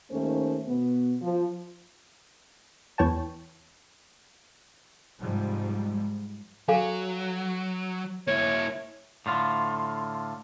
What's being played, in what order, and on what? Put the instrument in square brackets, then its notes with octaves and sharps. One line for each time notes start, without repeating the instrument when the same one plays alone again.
[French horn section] D#2 D#3 A3 C#4 C5
B2 B3
F3
[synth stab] E2 E3 C#5 G5 A5
[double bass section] G#2 C3 F3 G3 G#3
[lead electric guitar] F#3 [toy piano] A4 F5 G#5
[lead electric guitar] A#3 E4 [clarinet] C#5
[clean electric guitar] A2 D3 F4